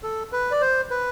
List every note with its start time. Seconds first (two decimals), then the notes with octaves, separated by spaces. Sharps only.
0.03 A4
0.32 B4
0.51 D5
0.61 C5
0.90 B4